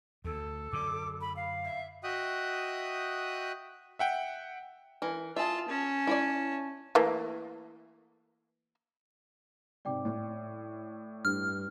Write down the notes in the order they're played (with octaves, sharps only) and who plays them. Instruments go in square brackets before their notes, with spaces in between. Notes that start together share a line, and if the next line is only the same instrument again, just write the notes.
[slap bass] D2 [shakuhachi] A4
[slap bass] F#2 D3 [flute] D6
[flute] B5
F5
[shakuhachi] E5
[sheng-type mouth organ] F#4 D#5 E5 G5 D#6 F#6
[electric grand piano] E5 F#5 G5
[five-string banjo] E3 A#4
[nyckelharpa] F4 A5 [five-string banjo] G#4 E5
[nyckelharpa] C#4 A5
[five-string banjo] E4 C#5 D5
[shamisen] E3 A3 A#3
[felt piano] G#2 C3 [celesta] D5 G5 D6
[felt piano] A2
[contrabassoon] G2 [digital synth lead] F6